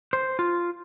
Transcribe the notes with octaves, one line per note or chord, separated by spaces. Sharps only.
C5
F4